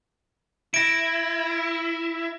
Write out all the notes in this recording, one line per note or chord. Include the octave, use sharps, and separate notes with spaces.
E4 A#6 D7